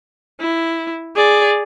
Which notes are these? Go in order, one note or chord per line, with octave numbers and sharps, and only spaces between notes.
E4
G#4 D5